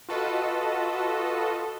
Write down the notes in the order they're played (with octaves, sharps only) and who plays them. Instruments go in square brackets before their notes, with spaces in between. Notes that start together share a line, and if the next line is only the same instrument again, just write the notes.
[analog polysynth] F4 F#4 A4 B4 D#5